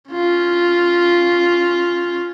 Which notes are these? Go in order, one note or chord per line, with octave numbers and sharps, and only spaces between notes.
C#4 F4